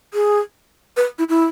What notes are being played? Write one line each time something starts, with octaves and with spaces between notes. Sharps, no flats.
G#4
B4
E4
E4